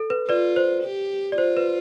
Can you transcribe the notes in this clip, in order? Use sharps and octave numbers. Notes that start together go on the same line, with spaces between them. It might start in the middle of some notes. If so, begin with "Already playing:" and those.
Already playing: A4
B4
F4 B4 D5
C5
G4
D5
F4 C5
B4